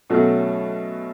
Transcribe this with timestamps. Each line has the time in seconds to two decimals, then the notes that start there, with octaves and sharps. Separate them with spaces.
0.10 B2 F#3 A3 C#4